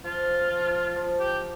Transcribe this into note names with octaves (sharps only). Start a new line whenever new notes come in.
F3 F4
F3
F3
G4